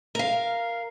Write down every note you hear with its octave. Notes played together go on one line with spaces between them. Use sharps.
A#4 F5